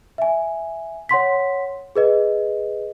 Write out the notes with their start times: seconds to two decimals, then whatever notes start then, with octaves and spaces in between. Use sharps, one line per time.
0.18 E5 G#5
1.09 C#5 F#5 C6 B6
1.96 G#4 B4 D#5